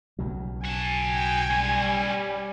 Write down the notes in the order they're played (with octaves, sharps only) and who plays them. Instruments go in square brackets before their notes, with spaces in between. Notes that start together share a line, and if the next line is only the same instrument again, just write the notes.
[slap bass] B1 C#3 F#3
[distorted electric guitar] F#4 A5 [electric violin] G#5
[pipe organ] G5
[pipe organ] G3 [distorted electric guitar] C#4 G5